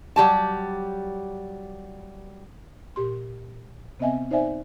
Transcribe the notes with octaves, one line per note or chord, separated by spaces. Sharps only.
F#3 G3 G4 A5
A#2 G4 C6
C3 B3 C4 D#5 E5 G#5
D#4 C5 D5 E5 G#5